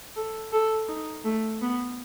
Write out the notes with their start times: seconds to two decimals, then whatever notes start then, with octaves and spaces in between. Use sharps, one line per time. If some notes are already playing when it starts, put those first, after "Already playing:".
0.16 A4
0.52 A4
0.88 D#4
1.24 A3
1.62 B3